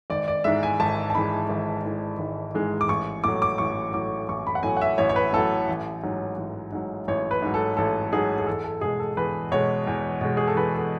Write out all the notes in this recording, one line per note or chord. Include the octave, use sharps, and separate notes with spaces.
G#1 D5
D5
G#2 E3 G#3 E5
G#5
G#1 A5
A5
G#2 E3 G#3 B5
G#1
G#2 E3 G#3
G#1
G#2 E3 G#3
D6
A1 C#6
A2 F#3 D6
D6
A1 C#6
A2 F#3 D6
A1 C#6
B5
F#5
A2 F#3 G#5
F#5
E5
A1 C#5
C#5
B4
A2 F#3 A4
A1
G#2 F#3
A1
G#2 F#3
A1 C#5
B4
G#2 F#3
A4
A1 A4
G#2 F#3 G#4
G#4
E2 A4
A4
B2 G#3 G#4
A4
E2 B4
B2 G#3 C#5
E2
B2 G#3
G#4
A4
E2 B4
A4